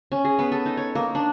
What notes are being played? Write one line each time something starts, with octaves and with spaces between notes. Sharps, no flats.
C#4
G#4
B3
A4
D#4
C#5
A#3
D4